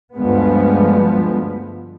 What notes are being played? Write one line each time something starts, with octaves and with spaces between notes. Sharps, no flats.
D2 G2 F3 G#3 B3